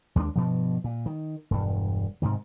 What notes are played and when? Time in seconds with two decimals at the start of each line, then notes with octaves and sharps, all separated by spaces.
0.16 D#2 G#3 B3 D4
0.36 G2 B2 F3
0.84 A#2
1.06 D#3
1.51 E1 G2
2.22 G#2 C3 D#3